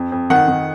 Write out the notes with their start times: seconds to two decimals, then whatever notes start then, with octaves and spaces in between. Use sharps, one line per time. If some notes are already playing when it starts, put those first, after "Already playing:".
Already playing: F2
0.12 F2
0.30 D#3 F#5
0.48 D#3